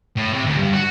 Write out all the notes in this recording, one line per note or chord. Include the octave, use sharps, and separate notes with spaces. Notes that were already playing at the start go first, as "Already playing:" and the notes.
A2
C3
D2
G2
F#4